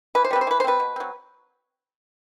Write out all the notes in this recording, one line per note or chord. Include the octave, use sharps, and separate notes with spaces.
E3 B4
C5
G3 C4 B4
C5
E3 B4
C5
G3 C4 B4
B2
F#3 C4